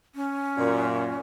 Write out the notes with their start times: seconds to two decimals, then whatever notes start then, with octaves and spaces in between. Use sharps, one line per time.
0.15 C#4
0.58 F#2 A#2